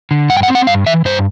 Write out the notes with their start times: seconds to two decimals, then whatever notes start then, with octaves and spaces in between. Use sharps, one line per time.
0.11 D3
0.29 G2 F#5
0.37 G5
0.43 F#5
0.48 C4
0.55 F#5
0.67 G2 F5
0.86 E3 E5
1.05 G2 C5